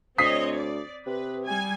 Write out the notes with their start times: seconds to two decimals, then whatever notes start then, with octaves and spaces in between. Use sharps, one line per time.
0.18 D2 C4 C#5 D#5 D#6 B6 C7
0.55 D5
1.06 C3 B4
1.44 G3 G#5